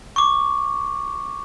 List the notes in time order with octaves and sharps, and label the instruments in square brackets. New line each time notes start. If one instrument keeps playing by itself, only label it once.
[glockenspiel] C#6 D6